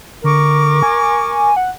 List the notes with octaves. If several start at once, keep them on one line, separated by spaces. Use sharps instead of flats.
D3 A#4 C#6 D6
G#5
F#5